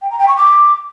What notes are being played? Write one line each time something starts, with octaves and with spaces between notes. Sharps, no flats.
G5
A#5
G5
C#6
D6